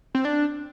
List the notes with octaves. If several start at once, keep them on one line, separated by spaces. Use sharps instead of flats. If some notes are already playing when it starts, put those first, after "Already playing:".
C4
D4